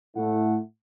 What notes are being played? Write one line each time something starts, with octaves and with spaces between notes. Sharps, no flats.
A2 A3 E4 F#5